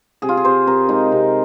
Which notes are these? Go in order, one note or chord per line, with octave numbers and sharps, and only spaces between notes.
C3 G#4
F4
G#4
C3 C5
C3 A#4
G#3 D#4
C3